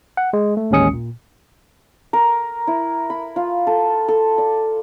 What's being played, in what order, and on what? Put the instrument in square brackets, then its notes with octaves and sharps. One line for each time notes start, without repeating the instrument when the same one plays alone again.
[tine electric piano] F#5
G#3
A3
A1 D#2 G#3 C#4 D#6 C#7
A#2
[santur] A#4
E4
B5
F4
A4
A4
D5